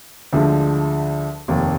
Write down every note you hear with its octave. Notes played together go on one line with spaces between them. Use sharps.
D2 D3 F3 G#3
F1 D#2 D#3